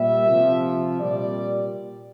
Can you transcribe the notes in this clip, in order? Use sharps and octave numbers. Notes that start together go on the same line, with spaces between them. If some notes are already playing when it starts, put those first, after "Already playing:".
Already playing: A#2 G3 E5
C3 F3
A#2 G3 D5